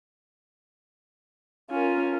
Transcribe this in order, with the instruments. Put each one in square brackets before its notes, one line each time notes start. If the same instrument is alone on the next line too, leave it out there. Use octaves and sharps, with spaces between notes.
[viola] C#4 [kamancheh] F4 A#4